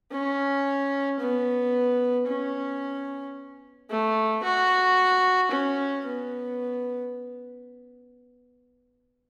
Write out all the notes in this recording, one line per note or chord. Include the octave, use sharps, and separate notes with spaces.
C#4
B3
C#4
A3
F#4
C#4
B3